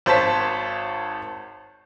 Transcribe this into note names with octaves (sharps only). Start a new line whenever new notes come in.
G#1 C5 C#5 A5 B6